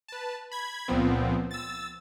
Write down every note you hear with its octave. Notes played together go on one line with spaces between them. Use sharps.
B4 A5
B5 G#6
C#2 A#2 F3 B3 C4
E6 A6